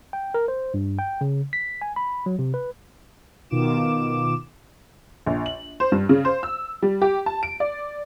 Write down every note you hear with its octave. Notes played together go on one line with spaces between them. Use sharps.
G5
A#4
C5
G2
G5
C#3
B6
G#5
B5
F#3
C3
B4
B2 D#3 F4 D6 E7
A#1
F#7
C5
G2
C#3
C5
E6
G3
G4
A5
D7
D5